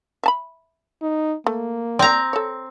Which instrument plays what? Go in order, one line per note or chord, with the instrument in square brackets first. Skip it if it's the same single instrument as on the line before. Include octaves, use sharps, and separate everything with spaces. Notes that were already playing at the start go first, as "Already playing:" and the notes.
[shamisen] E5 A5 B5
[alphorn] D#4
[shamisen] A3 [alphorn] A#3
[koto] C4 A#5 [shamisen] D5
[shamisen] A4 C#5